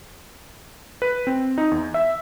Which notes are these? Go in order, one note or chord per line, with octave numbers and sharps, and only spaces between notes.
B4
C4
D#4
E2
E5